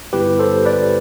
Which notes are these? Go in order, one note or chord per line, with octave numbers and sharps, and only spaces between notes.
G2 D3 G3 B3 E4 G4 B4
A4 C5
B4 D5